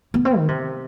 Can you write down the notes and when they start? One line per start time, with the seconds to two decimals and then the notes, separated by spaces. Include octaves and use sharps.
0.14 B3
0.25 C4
0.38 D#3
0.48 C3